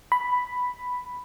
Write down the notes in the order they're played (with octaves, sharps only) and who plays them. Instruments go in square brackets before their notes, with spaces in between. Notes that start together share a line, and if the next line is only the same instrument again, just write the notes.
[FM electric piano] B5